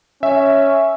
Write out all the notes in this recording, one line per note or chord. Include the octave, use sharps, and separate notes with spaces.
C#4 E5